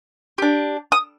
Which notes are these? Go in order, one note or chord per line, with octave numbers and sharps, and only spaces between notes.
D4 G4
D#6